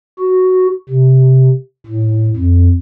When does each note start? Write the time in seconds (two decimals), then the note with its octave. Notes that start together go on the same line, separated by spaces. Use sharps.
0.19 F#4
0.89 C3
1.86 A2
2.36 F2